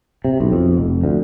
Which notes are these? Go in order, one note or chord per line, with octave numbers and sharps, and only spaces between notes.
C3
B1
F2
F1
D2